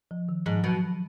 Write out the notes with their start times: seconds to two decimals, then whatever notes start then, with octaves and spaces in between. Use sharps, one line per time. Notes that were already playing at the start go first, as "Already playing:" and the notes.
0.11 F3
0.29 D#3
0.46 G#2 F3
0.64 B2 F#3